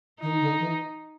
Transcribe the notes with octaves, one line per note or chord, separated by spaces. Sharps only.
D#3 D#4
D3
E3